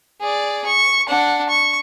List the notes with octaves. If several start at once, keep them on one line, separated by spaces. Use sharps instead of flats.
G#4 D5
C#6
D4 F#5
C#6